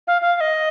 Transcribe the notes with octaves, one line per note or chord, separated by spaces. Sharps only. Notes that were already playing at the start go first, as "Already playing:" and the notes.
F5
F5
F5
D#5